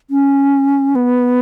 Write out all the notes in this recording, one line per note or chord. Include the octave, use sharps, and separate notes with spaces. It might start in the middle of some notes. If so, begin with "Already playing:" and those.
C#4
B3